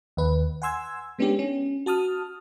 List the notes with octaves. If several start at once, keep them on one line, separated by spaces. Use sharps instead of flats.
D#2 B4
F#5 G#5 C6 E6 G#6
G#3 B3 C#4 D4 G4
C#4
F#4 A5 D#6 F6